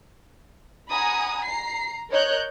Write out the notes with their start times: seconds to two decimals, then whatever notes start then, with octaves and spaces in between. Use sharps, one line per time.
0.90 F#5 G#5 A#5 B5 D#6
1.45 A#5 C7
2.12 A#4 C#5 D#5 F#6 G6